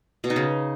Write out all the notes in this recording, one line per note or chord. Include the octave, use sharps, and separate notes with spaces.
B2
D#4
C#3